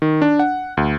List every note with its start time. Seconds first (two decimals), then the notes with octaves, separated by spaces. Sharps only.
0.02 D#3
0.22 D4
0.39 F#5
0.77 D2